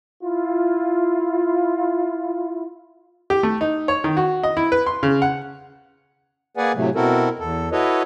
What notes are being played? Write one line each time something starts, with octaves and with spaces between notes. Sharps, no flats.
E4 F4
G4
A3
D#4
C#5
D#3
F#4
D#5
E4
B4
C6
C#3
F#5
A#3 G#4 B4 D5 F#5 G#5
A2 C3 F#3 A3
B2 C4 E4 F#4 A4 A#4
E2 A4
E4 F#4 A4 B4 C#5 D#5